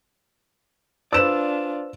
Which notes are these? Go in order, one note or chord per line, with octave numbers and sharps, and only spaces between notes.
D4 F4 B4 C5 D5 E6 E7